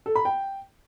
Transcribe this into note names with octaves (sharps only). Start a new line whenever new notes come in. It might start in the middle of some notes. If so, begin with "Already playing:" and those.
A4
B5
G5